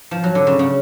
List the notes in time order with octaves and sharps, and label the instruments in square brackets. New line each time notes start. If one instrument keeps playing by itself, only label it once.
[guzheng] F3
F#3
D3
C#3
C#3